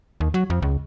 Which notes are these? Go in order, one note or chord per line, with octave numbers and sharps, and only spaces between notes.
D#2
F#3
F2
C#2